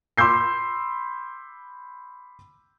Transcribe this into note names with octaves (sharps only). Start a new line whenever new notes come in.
B5 C6 D6 E6 G6 C7